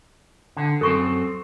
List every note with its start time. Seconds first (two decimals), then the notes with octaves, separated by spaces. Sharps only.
0.57 D3
0.81 F#2 C4 A4 C#6